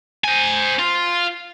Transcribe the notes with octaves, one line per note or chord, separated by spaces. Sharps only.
C5 G#5
F4